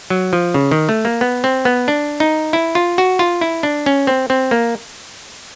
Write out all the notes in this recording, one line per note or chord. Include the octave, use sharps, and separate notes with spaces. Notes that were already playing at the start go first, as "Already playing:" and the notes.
F#3
F3
C#3
D#3
A3
A#3
B3
C4
B3
D4
D#4
E4
F4
F#4
F4
E4
D4
C#4
C4
C4
A#3